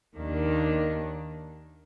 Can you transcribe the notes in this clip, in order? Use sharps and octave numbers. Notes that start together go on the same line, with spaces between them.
D#2 D#3 A#3 D4